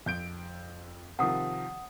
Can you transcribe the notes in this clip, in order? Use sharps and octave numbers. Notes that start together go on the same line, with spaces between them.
F2 G6 D7
C3 D#3 F3 F#5 D#6